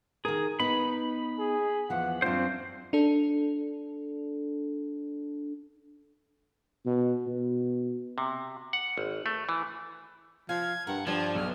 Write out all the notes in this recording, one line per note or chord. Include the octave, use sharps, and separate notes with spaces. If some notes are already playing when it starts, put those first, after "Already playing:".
D#3 G#4 A#4
B3 D#4 B5
G#4
E2 F3 F#5
F#2 C4 D4 F4 C5
D4 A4
B2
B2
C3
F#5
G#1
A3
E3
F3 F5 G#6
G2 A#4 F#5
G2 F3 D5 G#6
B1 F6